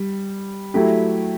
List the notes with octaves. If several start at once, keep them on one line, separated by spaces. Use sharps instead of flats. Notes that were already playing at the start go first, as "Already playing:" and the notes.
Already playing: G3
F#3 A3 E4 G4